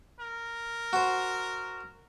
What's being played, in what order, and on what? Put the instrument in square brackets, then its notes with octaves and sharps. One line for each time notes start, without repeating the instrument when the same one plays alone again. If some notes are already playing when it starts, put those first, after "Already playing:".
[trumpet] A#4
[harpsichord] F#4 C5